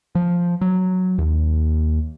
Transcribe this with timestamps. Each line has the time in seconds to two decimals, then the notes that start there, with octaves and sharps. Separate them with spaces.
0.15 F3
0.61 F#3
1.18 D#2